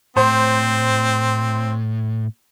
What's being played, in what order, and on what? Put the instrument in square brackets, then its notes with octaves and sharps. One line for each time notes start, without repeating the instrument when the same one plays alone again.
[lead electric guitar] A2 [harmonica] C4 [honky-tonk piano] C5